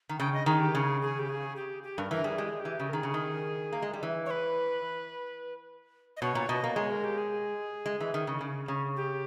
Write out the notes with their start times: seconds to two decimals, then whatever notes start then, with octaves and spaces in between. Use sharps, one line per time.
0.09 D#3
0.19 C#3 G5
0.33 D#5
0.46 D#3 G#4
0.60 G4
0.74 C#3 G#4
1.02 G#4
1.19 G4
1.29 G#4
1.56 G4
1.83 G4
1.98 G2 A#4
2.11 E3 A#4
2.24 G3 G#4
2.38 G#3 G4
2.49 G#4
2.60 G4
2.65 E3
2.80 C#3
2.89 A#4
2.93 D#3 G#4
3.03 C#3
3.14 D#3
3.73 A#3
3.82 G#3
3.93 G3
4.03 E3
4.26 C#5
4.31 B4
6.17 D#5
6.22 B2 C#5
6.35 A#2
6.49 B2 D#5
6.64 A#3
6.76 G#3 C#5
6.90 A#4
7.04 G4
7.18 G#4
7.86 G#3
8.01 E3
8.14 D#3
8.27 C#3
8.41 C#3
8.68 C#3
8.96 G4